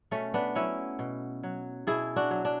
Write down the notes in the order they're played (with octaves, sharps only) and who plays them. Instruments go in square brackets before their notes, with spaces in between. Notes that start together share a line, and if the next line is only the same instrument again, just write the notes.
[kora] B2 A3 C#4
B3 D4
F#3 C#4 E4
B2
F#3
B2 E4 G#4
D4 F#4
F#3
D4